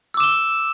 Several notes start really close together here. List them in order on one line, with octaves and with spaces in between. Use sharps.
E6 D6 E7 G7